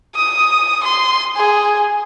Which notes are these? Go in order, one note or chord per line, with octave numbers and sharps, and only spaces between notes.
D#6
C6
G#4